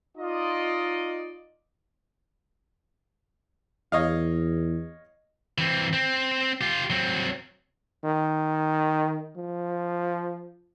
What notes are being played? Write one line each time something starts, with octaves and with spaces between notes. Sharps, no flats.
D#4 F4 D5 D#5
E2 C#5 D#5 F5
E3 C4
C4
F4 G4
F#3 C4
D#3
F3